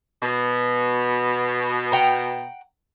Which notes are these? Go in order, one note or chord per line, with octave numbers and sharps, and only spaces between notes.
B2
F#5 G5 A#5